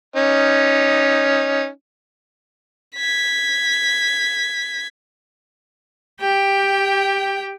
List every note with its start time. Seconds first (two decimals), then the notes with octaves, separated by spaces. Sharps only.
0.16 C#4 D#4
2.96 G#6 B6
6.21 G4 G5